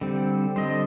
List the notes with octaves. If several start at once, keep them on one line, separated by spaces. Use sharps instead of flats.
D3 G3 C4
D3 G3 C4 C5 D#5